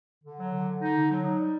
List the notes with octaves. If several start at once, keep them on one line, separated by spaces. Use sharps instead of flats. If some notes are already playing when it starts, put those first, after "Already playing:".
D3
F#3
D3
D3
D#4
D3
F#3
D#4
G3